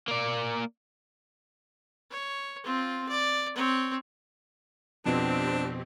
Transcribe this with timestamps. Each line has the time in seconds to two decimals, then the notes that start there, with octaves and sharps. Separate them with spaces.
0.08 A#3 D5
2.11 C#5
2.64 C4 F4
3.09 D5
3.55 C4 C#5
5.06 F2 B2 C4 D4 G4